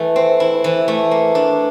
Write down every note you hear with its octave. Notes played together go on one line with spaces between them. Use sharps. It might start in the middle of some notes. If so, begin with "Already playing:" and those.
Already playing: E3 A3 E4
C4
E4
E3
A3
A#3
D4